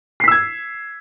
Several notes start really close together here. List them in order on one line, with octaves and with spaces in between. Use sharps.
C7 B6 E6 G#6